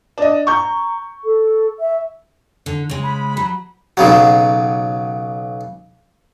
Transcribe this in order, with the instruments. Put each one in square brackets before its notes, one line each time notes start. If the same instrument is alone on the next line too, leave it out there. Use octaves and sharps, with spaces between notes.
[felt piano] D4 D#5
[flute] A#5 [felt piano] C#6 G6
[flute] A4
E5
[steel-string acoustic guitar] D3
C#3 G#3
[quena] B5
[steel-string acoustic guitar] F#3
[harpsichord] B1 C#3 F#3